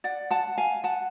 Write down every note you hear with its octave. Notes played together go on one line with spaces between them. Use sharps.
D5 F#5
F#5 A5
F5 G#5
F#5 A5